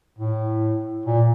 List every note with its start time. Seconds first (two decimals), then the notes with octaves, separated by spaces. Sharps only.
0.18 A2
1.05 A#2